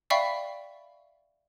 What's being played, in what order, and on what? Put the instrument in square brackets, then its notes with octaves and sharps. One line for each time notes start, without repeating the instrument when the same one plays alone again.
[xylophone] D5 E5 F5 G5 B5 C#6